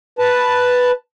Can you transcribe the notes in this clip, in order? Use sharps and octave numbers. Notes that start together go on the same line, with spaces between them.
B4 A5